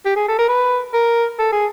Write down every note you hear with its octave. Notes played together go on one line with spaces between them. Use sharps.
G4
G#4
A4
A#4
B4
A#4
A4
G#4